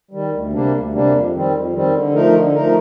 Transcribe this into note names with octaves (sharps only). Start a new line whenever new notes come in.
D#3 G3
D2
C3 G3 A#3 D4
D2
C3 G3 A#3 D4
F2
D#3 G3 C4
F2
D#3 G3 C4
D3
F3 A3 D#4 A#4
D3
F3 A3 D#4 A#4